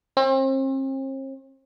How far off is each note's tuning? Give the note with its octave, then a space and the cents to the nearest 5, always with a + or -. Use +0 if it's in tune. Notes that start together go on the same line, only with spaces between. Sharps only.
C4 +40